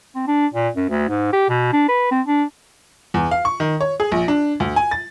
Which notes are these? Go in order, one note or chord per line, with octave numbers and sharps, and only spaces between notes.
C4
D4
A#2
F#2
D2
G#2
G4
B2
D4
B4
C4
D4
E2
F5
C#6
D#3
C#5
G#4
A#1
D4
D2
G#5
A6